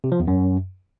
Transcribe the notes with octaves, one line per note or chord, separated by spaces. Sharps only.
C3
F3
E2
F#2